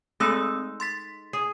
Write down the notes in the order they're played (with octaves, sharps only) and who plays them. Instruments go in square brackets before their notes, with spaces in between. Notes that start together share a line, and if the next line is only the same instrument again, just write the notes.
[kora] G#3 D#4 A4 [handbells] A3 C4 E6
[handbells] C6 A6 B6
[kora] G#4